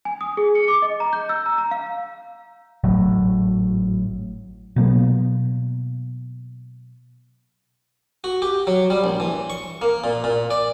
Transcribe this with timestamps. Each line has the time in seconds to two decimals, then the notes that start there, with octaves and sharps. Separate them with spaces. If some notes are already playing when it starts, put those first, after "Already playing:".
0.05 G#5
0.21 D#6
0.37 G#4
0.55 C#7
0.68 D6
0.82 D#5
1.00 A#5
1.13 G6
1.29 E6
1.46 A#5
1.58 A#5
1.71 F5
2.84 G#1 A2 F#3
4.76 B2 F#3 A#3 B3
8.24 F#4
8.42 G4
8.67 F#3
8.90 G3
9.04 A#1
9.20 E3
9.50 C#6
9.82 A#3
10.04 A#2
10.24 A#2
10.51 D5